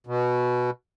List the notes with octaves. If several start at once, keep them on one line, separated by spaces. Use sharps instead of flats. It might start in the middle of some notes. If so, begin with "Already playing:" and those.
B2